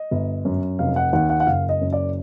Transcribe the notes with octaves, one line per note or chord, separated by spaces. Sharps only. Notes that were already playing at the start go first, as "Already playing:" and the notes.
Already playing: D#5
G1
F#2
F1 F5
F#5
D#2 F#5
F#5
F#5
F#1 F5
D#5
F#2
D5